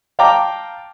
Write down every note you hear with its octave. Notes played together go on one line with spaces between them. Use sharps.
F5 G5 A5 A#5 D6